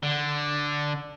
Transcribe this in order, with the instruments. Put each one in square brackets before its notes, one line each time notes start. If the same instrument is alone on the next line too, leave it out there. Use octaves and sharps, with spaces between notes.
[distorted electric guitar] D3